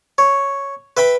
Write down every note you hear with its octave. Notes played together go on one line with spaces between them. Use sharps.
C#5
B4 E5 G5 B5